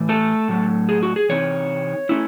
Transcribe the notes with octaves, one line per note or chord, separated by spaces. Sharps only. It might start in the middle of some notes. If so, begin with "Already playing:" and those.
Already playing: A2 E3
A3 A4
A2 F#3 A3
G#4
F#4
G#4
C3 E3 C4 D#4 C#5
A3 C#4 E4